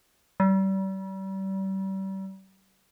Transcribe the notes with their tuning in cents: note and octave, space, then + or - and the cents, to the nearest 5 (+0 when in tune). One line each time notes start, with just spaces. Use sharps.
G3 -35